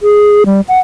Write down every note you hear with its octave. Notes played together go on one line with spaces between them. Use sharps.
G#4
G3
F#5